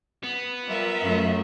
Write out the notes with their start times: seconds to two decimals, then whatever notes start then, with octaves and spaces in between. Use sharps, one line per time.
0.23 B3
0.66 G3 F4 A#4 E5
1.02 F#2 A3